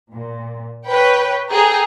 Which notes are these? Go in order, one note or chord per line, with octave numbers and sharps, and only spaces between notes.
A#2
B4 C#5 G5
G#4 A4 G5 A#5